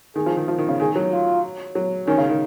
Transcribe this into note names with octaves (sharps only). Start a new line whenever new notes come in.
D#3 G#4
F3
D#3
F3
D#3
C#3
D#3 G#4
F#3
F4
F#3
D#3 C#4
C#3
D#3